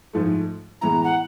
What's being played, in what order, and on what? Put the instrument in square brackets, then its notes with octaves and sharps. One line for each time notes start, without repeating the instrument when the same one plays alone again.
[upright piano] G#2 F3 A3
[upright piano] A2 E3 G#3 B3 E4 [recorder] A#5
[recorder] F#5